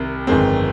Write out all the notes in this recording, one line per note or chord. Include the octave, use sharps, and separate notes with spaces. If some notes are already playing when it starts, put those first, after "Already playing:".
Already playing: C2 C3 D#3
G1 F2 D#3 G#3 C4